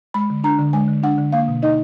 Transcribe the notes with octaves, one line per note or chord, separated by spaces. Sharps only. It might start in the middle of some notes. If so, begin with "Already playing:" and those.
G#3 B5
D3
D4 A#5
D3
G#3 G#5
D3
D4 F#5
D3
A#3 F5
B2
D#4 D#5